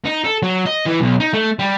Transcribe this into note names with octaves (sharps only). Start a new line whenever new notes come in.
D#4
A4
F#3
D#5
E3
B1
D#4
A3
G3